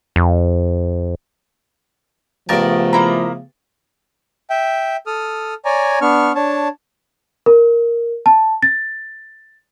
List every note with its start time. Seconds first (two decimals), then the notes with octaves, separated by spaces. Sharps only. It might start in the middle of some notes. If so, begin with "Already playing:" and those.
0.16 F2
2.49 G2 C#3 F3 A3 B3 A#4 D5 A5
2.93 A#3 E4 A#5
4.50 E5 G5
5.07 A4 D#6 F6
5.65 C#5 D5 G#5 A#5
6.01 B3 D4 C#6 F6
6.35 D4 C#5 A5
7.46 A#4
8.26 A5
8.62 A6